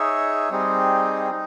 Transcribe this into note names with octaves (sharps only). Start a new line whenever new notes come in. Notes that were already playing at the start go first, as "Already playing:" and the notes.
Already playing: D#4 G#4 C#5 E5
G3 C4 D#4 G#4
D#4